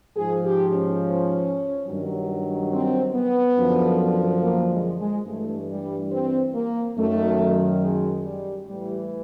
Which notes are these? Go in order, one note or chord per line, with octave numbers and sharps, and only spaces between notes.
G#2 F3 G#4
G4
C#4
G2 D#3 F#3
C4
B3
F#2 D3 F3
A#3
G#3
G#3
G2 E3 A3
G3
C4
A#3
F#2 D#3 F#3 A3
G#3
G3
A2 E3 G3